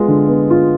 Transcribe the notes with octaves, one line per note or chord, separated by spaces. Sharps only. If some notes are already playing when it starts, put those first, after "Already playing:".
Already playing: G#3 B3 F4
D3
B3
F4